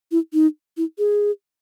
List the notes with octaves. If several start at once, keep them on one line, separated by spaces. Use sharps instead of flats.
E4
D#4
E4
G#4